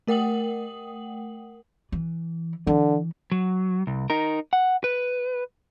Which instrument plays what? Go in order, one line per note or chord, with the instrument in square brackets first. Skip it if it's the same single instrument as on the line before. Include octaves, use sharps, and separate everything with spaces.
[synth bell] A3 A#4 F#5 G5 D#6 F#7
[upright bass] E3
[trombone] D3 [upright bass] E3
[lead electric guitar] F#3
C2
D#4 A#4
F#5
B4